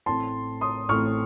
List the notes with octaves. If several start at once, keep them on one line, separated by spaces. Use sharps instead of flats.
A1 A2 A3 C4 A5 C6
C6 D#6
A1 A2 A3 C4 C#6 F6